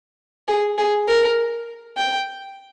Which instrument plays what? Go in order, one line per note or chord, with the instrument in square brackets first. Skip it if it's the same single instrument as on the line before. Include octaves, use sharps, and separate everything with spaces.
[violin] G#4
G#4
A#4
G5